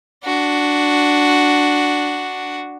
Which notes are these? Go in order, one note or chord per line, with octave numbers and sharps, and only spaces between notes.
D4 F#4